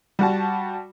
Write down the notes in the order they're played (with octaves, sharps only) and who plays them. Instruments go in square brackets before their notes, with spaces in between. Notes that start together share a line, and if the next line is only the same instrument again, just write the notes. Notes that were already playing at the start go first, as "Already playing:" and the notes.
[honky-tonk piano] G3 F#4 A5